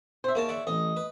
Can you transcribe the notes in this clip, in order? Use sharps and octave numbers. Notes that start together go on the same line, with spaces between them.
C5 E5
G#2 A#3 A#4 C#5 A5
D5 E5 F#5
A1 D#5
B4